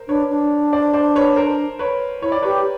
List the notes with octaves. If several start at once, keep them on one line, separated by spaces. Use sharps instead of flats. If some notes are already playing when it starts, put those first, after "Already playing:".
Already playing: A#4 C5
D4 B4 C#5
D4
C5 D5
C5 D5
B4 C#5
A#4 C5
B4 C#5
E4 C#5
D5
G4 B4 C#5